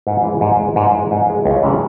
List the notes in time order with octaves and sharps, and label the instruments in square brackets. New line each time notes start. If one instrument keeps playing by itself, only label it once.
[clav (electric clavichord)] G#2
E3 G#3
G#2
E3 G#3
G#2
E3 G#3
G#2
E3 G#3
C#2
C3 E3 G#3 C#4